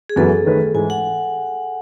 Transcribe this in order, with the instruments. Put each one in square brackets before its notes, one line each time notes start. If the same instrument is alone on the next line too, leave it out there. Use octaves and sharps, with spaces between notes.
[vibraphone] G#4
[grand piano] F#2 E3 B3 F#4 [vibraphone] A4
[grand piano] D#3 A3 C#4 G#4 B4
[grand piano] G#2 E3 G#3 [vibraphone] G#5
[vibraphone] F#5